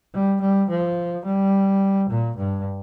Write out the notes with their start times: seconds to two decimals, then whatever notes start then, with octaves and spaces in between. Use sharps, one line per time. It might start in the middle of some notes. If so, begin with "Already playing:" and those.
0.14 G3
0.41 G3
0.69 F3
1.25 G3
2.10 A#2
2.37 G2